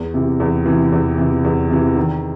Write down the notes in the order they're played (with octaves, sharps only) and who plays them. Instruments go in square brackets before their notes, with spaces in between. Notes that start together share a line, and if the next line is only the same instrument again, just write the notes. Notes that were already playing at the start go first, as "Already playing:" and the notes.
Already playing: [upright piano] E2
C3 E3
E2
C3 E3
E2
C3 E3
E2
C3 E3
D#3